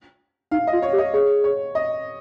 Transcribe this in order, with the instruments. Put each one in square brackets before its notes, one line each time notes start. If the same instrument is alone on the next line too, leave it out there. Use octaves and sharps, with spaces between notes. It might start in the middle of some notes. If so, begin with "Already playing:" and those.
[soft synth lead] D#4 [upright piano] F5
[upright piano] D#5
[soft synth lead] F4
[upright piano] C#5
[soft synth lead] G4
[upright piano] D#5
[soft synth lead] G#4 [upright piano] C#5
[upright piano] C#5
D#5